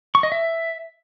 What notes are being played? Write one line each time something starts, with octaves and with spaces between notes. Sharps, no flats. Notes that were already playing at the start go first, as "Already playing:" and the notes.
C#6
D#5
E5